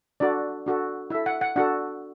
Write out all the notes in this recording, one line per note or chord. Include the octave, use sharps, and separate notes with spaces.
D4 F#4 A4 D5
D4 F#4 A4
E4 A4 E5
F#5
F#5
D4 F#4 A4 F#5